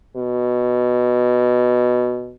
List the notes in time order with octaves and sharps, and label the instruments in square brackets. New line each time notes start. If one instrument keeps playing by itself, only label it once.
[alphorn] B2